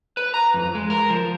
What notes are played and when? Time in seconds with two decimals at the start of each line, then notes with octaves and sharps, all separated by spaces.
0.17 B4
0.34 A#5
0.54 F2
0.75 G#3
0.90 A#4
1.10 F3